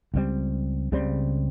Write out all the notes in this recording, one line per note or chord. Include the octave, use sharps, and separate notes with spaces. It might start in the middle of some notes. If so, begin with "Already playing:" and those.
C#2 C#3 G3 C4
C#2 C#3 G3 C4